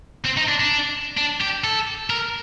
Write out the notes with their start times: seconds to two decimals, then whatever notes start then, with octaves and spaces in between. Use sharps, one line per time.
0.24 C4
0.37 D#4
0.48 D4
0.60 D4
1.18 D4
1.41 G4
1.64 A4
2.10 A#4